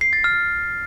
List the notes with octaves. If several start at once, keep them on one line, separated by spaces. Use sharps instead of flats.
C7
A6
F6